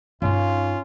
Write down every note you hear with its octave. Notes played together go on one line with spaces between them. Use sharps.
G2 C#4 D#4 F4